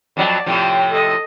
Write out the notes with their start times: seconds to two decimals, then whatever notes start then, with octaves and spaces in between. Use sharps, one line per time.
0.17 F2 F#3 F#4 D5 A5
0.46 A2 C3 F3 G5
0.91 A4 D#5